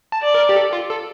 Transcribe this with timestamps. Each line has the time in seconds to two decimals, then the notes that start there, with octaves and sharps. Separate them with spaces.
0.12 A5
0.23 D5
0.34 A#4
0.49 G4
0.56 A4
0.73 F4
0.90 A4